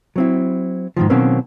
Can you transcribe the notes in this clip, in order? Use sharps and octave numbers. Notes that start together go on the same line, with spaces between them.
F#3 C4 E4
G#2 B2 D#3 F3
B2 D#3 F#3 A#3 C4 C#4